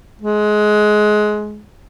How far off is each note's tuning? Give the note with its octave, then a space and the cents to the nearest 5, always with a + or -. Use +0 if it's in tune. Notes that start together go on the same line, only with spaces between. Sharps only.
G#3 +20